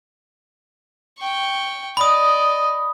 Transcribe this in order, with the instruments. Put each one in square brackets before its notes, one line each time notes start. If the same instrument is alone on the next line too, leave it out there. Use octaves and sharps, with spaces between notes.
[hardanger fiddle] G5 C#6
[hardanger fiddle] D5 D#5 [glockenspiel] B5 D#6